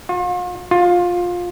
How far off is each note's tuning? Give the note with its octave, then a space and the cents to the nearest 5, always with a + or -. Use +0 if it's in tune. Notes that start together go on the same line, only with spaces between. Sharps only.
F4 +40
F4 +15